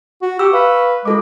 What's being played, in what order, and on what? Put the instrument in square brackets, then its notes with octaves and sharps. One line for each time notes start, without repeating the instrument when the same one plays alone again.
[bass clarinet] F#4
[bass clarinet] G4 [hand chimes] C#6 E6
[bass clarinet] B4 [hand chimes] F5
[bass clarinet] G#3 [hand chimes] F4 A4 D6